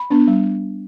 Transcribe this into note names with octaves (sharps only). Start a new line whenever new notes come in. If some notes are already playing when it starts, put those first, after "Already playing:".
Already playing: B5
B3 D4
G3